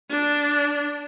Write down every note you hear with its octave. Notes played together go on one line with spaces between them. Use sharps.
D4